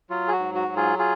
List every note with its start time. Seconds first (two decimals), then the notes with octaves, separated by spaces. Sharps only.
0.10 F#3 F4
0.28 G#4
0.32 F#4
0.39 G#2
0.54 F#4
0.69 F#3
0.76 F4 G#4
0.99 F4 G#4